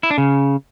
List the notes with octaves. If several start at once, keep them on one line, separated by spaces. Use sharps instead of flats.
E4
D4
C#3